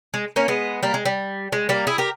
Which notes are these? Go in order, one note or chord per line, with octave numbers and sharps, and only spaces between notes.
G#3
A#3 C#4
G#3 B3
G3 A#3
G#3
G3
G#3
G3 A#3
E4 G#4
G4 A#4